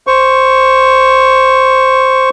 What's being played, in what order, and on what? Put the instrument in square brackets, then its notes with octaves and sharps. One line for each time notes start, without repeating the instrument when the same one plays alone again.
[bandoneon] C5 C#6